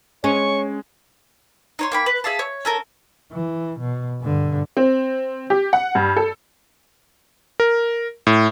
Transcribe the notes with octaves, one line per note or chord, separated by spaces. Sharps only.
G#3 C#4 C#5 C#6
D#4 C#5 C6
A#3 G5 B5
B4
G#4 E5 F5 A5
C#5
C#4 A4 A#4
E3
B2
G2 D3
C4
G4
F#5
G2
A4
A#4
A2